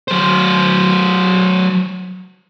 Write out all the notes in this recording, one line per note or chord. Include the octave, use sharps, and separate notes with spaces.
F#3 C5